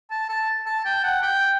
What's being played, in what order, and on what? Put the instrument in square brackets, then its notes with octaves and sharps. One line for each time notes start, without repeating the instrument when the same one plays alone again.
[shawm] A5
A5
A5
G5
F#5
G5